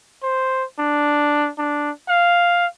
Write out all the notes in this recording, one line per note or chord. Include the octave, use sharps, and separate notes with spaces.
C5
D4
D4
F5